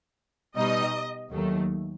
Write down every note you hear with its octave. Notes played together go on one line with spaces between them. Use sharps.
B2 G3 D#4 D#5
D#2 D#3 F#3 A3